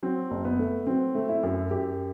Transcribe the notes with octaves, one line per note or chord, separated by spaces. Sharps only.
F#3 C4
F#1
B3
A3
F#3 C4
A3
E4
F#2
F#2 G4